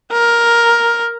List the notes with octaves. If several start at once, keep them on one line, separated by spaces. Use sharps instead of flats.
A#4